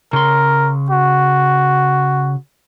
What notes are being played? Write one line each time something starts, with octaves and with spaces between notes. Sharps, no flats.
C#3 A#4 C6
F#4